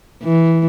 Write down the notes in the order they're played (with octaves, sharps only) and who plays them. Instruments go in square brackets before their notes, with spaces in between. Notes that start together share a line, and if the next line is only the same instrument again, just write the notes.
[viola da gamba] E3